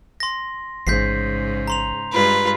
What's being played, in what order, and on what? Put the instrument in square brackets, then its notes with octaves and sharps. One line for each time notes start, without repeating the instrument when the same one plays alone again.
[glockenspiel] C6 A#6
[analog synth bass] A1 [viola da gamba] G#2 C#3 [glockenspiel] G6 B6 C7
[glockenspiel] A#5 C6 F7
[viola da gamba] G2 G#3 F4 [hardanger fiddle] B4